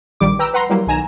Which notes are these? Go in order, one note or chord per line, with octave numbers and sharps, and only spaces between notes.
A#1 D#3 G3 D6
B4 G5 A#5 E6
B4 F#5 A#5 C6
F#3 G3 A#3 E4
B1 D#3 G#5 A#5 E7